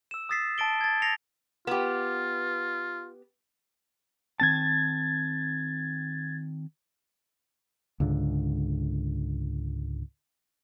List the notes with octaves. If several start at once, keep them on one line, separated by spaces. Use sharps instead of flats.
E6 E7
D#6 E6 A6 B6 C7
A5 A6 D7 G7
G#6 A6
A6 A#6 C7 C#7 F7
B3 F4 G4
D#3 C4 A5 G#6 A6
C#2 G#2 D3